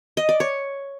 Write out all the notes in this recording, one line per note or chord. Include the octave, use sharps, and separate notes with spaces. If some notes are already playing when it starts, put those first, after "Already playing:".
D#5
D5
C#5